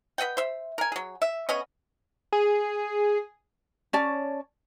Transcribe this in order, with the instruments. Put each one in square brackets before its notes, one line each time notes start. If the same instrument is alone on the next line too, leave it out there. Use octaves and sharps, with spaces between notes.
[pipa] B4 D#5 F#5 G5
C5 E5
A#4 G#5
F#3 G#4
E5
B3 C#4 G#4 D#5
[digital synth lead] G#4
[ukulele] C#4 C#5 D5 A5